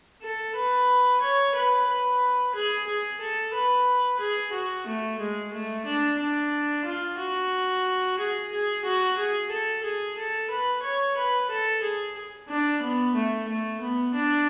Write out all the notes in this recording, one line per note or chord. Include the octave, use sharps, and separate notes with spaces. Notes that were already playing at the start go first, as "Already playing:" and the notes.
A4
B4
C#5
B4
B4
G#4
G#4
A4
B4
G#4
F#4
A3
G#3
A3
D4
D4
F4
F#4
G#4
G#4
F#4
G#4
A4
G#4
A4
B4
C#5
B4
A4
G#4
D4
B3
A3
A3
B3
D4